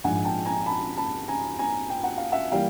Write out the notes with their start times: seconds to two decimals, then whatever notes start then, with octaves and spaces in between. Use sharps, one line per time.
0.04 A#1 G#2 F3 F#5 G#5
0.25 G5 A5
0.45 G#5 A#5
0.66 A5 B5
0.97 A5 B5
1.28 G#5 A#5
1.59 G#5 A#5
1.90 G5
2.04 F#5
2.18 F5
2.32 E5 F#5
2.52 E3 G3 A#3 F5 G5